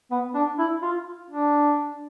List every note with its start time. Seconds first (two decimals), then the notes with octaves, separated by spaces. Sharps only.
0.11 B3
0.35 D4
0.58 E4
0.83 F4
1.30 D4